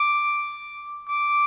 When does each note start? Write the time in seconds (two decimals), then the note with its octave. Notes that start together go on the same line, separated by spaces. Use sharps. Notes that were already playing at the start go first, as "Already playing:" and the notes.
Already playing: D6
1.09 D6